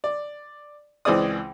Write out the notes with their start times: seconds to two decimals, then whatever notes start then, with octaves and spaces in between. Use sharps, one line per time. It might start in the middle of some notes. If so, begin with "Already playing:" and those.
0.04 D5
1.05 C#2 E3 C4 G#4 D5 D#6